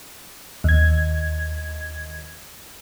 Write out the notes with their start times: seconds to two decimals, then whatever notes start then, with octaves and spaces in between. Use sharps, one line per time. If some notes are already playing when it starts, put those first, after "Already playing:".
0.64 D#2 G#6